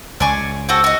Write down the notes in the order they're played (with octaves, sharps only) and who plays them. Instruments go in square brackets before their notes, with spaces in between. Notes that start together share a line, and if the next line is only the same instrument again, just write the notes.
[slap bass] C#2 [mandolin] D5 G#5 C#6
[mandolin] C4 F#4 A4
F#4 D#5